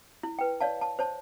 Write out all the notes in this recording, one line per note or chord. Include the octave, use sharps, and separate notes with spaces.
E4
B4 G5
C#5 D5 F5 A5
A5
C5 C#5 A5